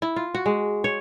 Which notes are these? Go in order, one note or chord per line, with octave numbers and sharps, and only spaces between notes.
E4
F4
F#4
G#3
C#5